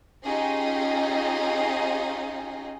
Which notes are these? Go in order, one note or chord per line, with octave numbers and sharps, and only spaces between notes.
C#4 D#4 F4 G4 G#4 D#5